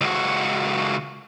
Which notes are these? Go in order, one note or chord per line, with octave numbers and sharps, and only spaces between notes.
C#2 F#4